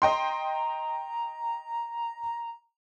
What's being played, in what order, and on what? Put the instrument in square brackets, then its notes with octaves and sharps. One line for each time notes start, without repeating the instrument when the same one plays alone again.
[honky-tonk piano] D#5 G5 C6 [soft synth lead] A#5